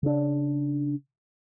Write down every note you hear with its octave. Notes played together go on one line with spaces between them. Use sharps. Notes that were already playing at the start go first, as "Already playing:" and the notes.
C#3 D4